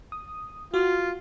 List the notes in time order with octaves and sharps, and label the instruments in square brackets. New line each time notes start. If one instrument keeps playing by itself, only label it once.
[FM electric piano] D#6
[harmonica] F4 [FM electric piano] F#4